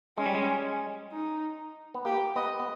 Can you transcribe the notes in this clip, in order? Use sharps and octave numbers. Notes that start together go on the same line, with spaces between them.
G#3 C#4
G3
G#3
D#4
B3
A#3 G4
B3 D#5
B3